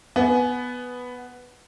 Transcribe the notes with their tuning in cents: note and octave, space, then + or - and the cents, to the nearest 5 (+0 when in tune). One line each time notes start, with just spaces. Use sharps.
B3 +0 G#5 +25